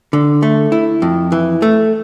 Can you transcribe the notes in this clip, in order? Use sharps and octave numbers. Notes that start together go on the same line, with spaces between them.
D3
A3
E4
F2
E3
A3